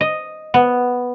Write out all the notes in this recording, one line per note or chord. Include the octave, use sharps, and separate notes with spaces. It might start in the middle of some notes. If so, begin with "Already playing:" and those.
D#5
B3